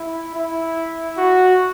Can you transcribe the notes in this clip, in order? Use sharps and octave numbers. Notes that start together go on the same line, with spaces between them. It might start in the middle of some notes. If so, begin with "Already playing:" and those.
Already playing: E4
E4
F#4